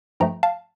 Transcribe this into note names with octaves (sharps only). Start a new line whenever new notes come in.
G2 F3 A3 G5 A#5
F5 A5